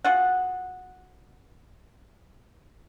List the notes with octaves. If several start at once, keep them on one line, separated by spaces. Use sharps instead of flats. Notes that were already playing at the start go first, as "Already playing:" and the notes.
F4 F#4 G#4 F#5